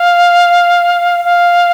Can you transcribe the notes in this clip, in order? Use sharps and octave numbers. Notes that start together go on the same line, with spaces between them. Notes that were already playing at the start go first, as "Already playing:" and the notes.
Already playing: F5
F5